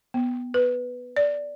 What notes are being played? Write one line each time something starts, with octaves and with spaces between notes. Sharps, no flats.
B3
B4
D5